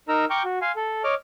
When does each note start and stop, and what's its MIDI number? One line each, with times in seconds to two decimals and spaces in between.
0.09 0.25 63
0.09 0.25 70
0.09 0.25 82
0.09 0.25 88
0.30 0.43 79
0.30 0.43 82
0.30 0.43 85
0.30 0.43 86
0.30 0.43 89
0.30 0.43 91
0.44 0.59 66
0.62 0.72 77
0.62 0.72 80
0.62 0.72 84
0.76 1.03 69
1.04 1.14 73
1.04 1.14 75
1.04 1.14 86
1.04 1.14 89